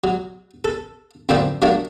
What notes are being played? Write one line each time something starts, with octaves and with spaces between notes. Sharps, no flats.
F#3
A4
F#2 A2 D3 F3 C4 D4
F#3 A3 A#3 D4